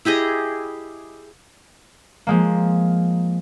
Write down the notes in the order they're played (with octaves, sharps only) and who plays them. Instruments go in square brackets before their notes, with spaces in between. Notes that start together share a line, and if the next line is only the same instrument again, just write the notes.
[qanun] E4 G4 G#4 D#5
[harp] F3 G#3 A#3